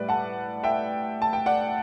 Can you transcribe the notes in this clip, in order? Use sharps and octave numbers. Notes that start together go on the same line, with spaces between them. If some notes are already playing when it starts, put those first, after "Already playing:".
Already playing: A2 G3 B4 D5
F#5 A5
E5 G5
A5
G5
D5 F#5